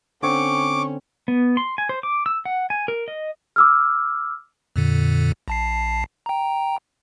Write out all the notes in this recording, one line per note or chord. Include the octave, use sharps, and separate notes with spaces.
D3 C4 C#4 C#6 D6
B3
C6
G#5
C5
D6
E6
F#5
G#5
A#4
D#5
D6 E6 F6
F2 A#2 D3
A#1 A5 C7
G5 A#5